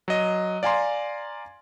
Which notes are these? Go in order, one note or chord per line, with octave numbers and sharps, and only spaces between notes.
F#3 D#5
D5 F5 G#5 A#5 C6